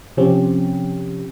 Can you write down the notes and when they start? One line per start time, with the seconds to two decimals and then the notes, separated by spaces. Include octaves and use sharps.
0.17 C3 F3 C4 C#4 G4